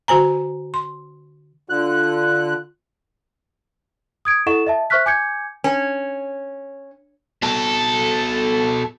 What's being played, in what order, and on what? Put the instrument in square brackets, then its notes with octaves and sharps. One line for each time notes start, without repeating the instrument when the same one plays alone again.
[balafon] D3 F#4 C5 G#5 A#5
C6
[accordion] D3 F#6 [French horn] F4
[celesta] D#6 G#6 D7
E4 A4 D#5 F#5 C#6 E7
D#5 E5 A5
C5 E5 C#6 F6 F#6 B6
G#5 D6 G6 G#6 C#7
[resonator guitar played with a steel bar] C#4
[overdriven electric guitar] B2 A4